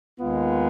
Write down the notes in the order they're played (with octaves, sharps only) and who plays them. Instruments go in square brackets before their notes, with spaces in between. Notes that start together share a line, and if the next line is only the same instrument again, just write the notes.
[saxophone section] D#2 D#3 G#3 B3 F4